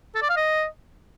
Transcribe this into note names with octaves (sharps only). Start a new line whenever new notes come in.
A4
D5
F5
D#5